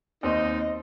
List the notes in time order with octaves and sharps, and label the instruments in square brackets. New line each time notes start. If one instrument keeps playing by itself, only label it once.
[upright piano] D#2 C4 C6 [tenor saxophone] D#4 [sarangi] D#5